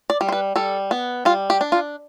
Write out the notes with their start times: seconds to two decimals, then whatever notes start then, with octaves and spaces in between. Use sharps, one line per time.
0.10 D5
0.21 G3
0.29 C5
0.32 B4
0.56 G3 A4
0.91 B3
1.25 G3 F4
1.50 G4
1.61 D4
1.72 F4